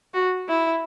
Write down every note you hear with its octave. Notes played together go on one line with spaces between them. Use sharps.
F#4
E4